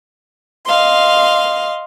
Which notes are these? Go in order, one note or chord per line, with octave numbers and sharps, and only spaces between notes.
D#5 F5 C6